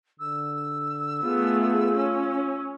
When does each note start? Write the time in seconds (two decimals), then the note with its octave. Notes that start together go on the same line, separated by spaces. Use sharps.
0.20 D3 E6
1.23 A3 B3 F4 G#4
1.95 C#4